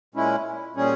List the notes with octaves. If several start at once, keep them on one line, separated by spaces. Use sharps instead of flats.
A#2 G#3 C#4 E4
A#2 G3 C#4 G#4